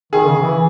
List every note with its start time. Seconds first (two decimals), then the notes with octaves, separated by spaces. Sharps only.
0.13 D#3 G#4
0.27 C#3
0.42 E3